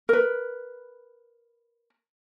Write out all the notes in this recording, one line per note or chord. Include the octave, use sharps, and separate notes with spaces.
A#4 B4